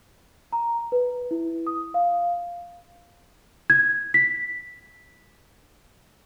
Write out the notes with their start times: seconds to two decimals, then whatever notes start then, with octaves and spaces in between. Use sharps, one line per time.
0.53 A#5
0.92 B4
1.31 E4
1.67 D#6
1.94 F5
3.70 G#6
4.14 B6